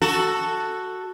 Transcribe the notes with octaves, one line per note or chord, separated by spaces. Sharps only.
F#4 A4